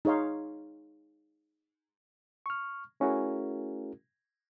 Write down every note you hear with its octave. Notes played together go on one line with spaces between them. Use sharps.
D#4 G#4 C#5 F5 C6
C#6 F6
A3 C#4 E4 F#4 G#4 A#4